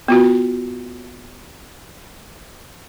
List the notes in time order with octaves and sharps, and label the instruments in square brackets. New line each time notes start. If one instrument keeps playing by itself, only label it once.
[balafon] B3 F4 F#4